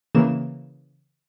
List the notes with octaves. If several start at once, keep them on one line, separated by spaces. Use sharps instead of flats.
C#3 E3 A#3 E7